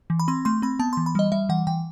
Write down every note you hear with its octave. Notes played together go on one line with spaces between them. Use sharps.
E3
B5
C4 C6
A3 C6
C4 B5
B3 A5
C6
E3
B5
G3 D#5
G3 E5
E3 F#5
E3 G5